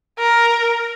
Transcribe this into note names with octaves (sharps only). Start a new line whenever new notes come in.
A#4